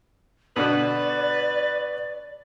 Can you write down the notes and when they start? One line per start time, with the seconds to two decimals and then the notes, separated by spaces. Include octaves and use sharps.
0.56 B2 D3 F#4 B4 D5